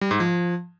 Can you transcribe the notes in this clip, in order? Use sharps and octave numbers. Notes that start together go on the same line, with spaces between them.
G3
G#2
F3